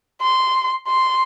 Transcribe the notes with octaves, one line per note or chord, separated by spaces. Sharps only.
C6
C6